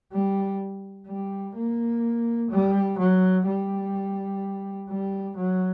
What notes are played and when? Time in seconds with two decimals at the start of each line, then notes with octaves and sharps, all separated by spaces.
0.13 G3
1.08 G3
1.55 A#3
2.51 G3
2.98 F#3
3.46 G3
4.89 G3
5.37 F#3